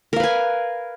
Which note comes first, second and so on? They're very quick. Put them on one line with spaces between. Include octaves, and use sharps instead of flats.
A#4 F5 B4 G#5